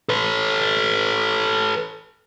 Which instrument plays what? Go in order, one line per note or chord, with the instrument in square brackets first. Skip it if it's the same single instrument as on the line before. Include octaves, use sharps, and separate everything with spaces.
[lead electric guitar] A4 B4